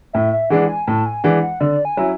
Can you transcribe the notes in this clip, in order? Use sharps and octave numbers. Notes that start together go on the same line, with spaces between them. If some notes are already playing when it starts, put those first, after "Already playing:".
A2 E5
E5
E3 G#3 D4 F#5
G#5
A2 A5
G#5
E3 G#3 D4 F#5
F#5
D3 D5
G#5
F#3 C#4 E4